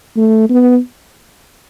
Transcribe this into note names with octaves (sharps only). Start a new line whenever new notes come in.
A3
B3